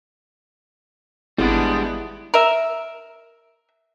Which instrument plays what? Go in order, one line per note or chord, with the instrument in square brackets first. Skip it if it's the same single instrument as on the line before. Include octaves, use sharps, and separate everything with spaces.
[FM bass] G#1 [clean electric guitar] G3 G#3 D4 [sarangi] B3 [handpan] E4 G#4
[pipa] A#4 E5